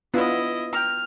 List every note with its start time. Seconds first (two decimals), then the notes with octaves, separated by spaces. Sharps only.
0.14 B3 D4 E4 F4 D#5
0.73 G5 A#5 F6